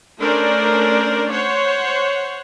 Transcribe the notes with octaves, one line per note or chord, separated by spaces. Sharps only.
A3 C#4 D4 A#4 C5 D5
C5 C#5 F#5